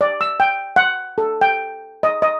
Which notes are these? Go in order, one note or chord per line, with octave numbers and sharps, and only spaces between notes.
D5
E6
G5
F#5
A4
G5
D#5
D#5